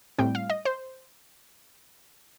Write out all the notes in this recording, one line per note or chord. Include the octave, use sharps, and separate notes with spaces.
A2 G3 C4 G5
F5
D#5
C5